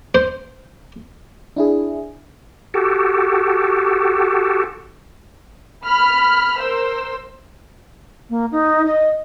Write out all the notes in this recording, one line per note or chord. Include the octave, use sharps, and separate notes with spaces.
C5
D4 E4 G#4
F#4 G4 A4
B5 F6
A#4 C5 E6
A#3
D#4
D#5